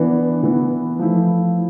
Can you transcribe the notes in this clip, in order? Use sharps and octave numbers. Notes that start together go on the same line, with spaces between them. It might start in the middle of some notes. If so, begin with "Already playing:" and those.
Already playing: E3 B3 D4
E3 B3 E4
F3 A3 E4